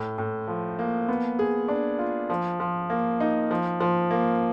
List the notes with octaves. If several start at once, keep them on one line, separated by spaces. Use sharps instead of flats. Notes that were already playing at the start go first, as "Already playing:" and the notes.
Already playing: A2
A2
F3
A#3
B3
G#4
D4
F4
F3
F3
A#3
D#4
F3
F3
A#3